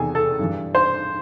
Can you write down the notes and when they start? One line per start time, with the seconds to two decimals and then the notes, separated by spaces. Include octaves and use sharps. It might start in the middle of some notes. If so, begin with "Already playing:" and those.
Already playing: E2 C3 D#3 G#4 A4 G#5
0.15 A4 A5
0.39 G2 E3
0.75 C5 C6